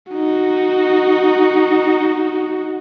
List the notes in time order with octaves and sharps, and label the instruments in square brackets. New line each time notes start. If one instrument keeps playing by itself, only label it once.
[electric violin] D#4 F#4